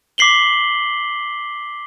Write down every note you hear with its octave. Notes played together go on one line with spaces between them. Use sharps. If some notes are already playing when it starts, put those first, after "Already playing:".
D6 B6 C7 F#7 G7